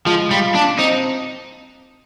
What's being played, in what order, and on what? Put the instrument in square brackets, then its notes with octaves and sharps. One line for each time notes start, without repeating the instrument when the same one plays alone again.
[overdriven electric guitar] F3 [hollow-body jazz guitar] G#3
[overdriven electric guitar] G3 [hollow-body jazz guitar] F4
[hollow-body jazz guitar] A#2 [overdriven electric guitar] D4
[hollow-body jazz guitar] C4 [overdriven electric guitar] D#4